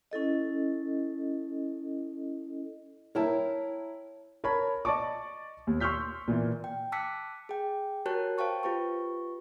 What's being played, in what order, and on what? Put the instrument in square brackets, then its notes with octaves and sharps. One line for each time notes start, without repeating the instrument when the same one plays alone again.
[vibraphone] C#4 E4 A4 D#5
[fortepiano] E4 A#4 [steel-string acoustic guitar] C#5 G5 A5
[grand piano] A#4 C#5 A5 B5
D5 D#5 A5 C#6 D6
D#2
C6 C#6 E6 F6 G6 B6
A#2 E3
[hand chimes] G5
A5 D6 E6 F#6 B6 C#7
G#4 G5
F#4 G4 A#4 C#5 A5 F#6
C5 F5 G5 A5 C#6
F4 G4 B4 C#6